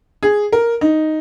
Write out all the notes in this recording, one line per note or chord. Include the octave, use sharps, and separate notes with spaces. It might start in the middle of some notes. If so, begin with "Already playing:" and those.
G#4
A#4
D#4